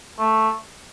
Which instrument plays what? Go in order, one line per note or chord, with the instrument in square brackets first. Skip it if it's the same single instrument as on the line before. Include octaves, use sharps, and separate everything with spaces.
[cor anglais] A3